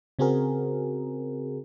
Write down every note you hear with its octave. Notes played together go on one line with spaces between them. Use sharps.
C#3 C4 F#4 G#4 A#4